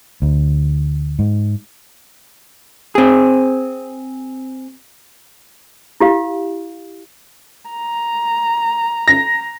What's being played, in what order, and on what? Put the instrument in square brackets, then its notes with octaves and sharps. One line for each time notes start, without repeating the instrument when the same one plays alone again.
[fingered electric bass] D2
G#2
[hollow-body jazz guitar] C4 G#4
[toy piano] E4 G4 F5
[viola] A#5
[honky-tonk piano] A#6